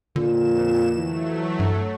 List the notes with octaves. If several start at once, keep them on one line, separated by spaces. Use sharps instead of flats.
F2 A#2 D3 E7
E3 F#3 A3
G2